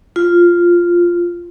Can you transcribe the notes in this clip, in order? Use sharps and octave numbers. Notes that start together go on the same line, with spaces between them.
F4